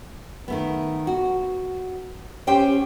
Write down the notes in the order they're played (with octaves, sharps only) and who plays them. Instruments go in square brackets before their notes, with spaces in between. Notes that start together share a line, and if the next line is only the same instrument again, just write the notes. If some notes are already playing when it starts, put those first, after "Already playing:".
[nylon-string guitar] D#3 A3 B3
F#4
C#4 G4 C5 G5